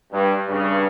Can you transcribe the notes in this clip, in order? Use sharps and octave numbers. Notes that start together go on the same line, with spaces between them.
G2
G2 C#3